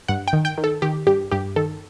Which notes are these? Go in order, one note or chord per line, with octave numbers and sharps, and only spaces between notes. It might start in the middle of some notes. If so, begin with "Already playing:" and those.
G2 F#5
G5
D#3
G5
D#3
A4
D#3 G4
G2 G4
G2 G4
D#3 A4